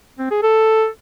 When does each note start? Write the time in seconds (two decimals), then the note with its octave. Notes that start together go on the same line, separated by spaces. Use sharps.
0.19 C4
0.31 G#4
0.43 A4